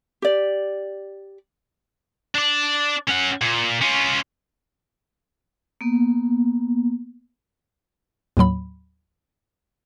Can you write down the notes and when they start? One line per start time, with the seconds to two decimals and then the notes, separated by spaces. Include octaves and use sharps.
0.22 G4 D5
2.35 D4 D5
3.08 C#4 F#5
3.41 A#2
3.82 C#4 F4
5.81 A#3 B3
8.37 D#2 A2 F#3 B5